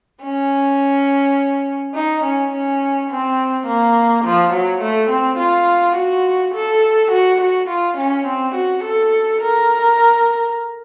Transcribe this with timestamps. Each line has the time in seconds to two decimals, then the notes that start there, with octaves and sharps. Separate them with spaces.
0.23 C#4
1.94 D#4
2.24 C#4
2.52 C#4
3.10 C4
3.67 A#3
4.25 F3
4.53 F#3
4.82 A3
5.10 C4
5.39 F4
5.96 F#4
6.55 A4
7.11 F#4
7.41 F#4
7.70 F4
7.97 C#4
8.27 C4
8.55 F#4
8.84 A4
9.42 A#4